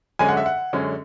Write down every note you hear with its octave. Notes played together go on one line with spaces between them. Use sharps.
F#2 D3 G#3 C#4 G#5
F#5
E5
F#5
F#2 D3 G#3 C#4